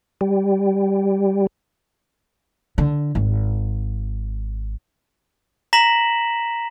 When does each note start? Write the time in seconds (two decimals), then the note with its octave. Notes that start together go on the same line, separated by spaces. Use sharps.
0.21 G3
2.78 D3
3.15 G#1
5.73 A#5 A#6 B6 E7 F#7